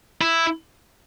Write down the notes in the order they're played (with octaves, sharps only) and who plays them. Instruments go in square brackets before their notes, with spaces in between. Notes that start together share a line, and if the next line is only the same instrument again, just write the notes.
[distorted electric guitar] E4